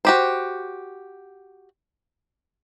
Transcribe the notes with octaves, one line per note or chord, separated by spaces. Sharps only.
F#4 G4 C5